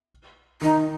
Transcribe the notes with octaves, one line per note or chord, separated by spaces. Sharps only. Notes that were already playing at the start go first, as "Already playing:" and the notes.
D#3 D#4